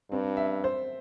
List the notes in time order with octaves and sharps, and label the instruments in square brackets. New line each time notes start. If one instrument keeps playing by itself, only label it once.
[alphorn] G2 [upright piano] C4
[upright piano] E5
C5